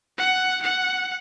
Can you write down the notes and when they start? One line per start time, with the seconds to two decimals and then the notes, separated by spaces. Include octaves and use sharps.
0.18 F#5
0.62 F#5